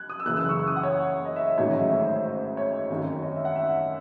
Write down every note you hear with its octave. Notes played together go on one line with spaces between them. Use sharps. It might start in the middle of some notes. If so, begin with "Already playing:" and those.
Already playing: F#6 G#6
D#6
E6
F#1 F#2 C#3 E3 F#6
E6
C#6
C#6
D#6
F#5
C#5
D#5
E5
D#5
A1 G#2 D#3 F#3 A3 C#5
D#5
E5
C#5
C5
C5
C#5
G#1 F#2 D#3 F#3
D#5
E5
F#5
E5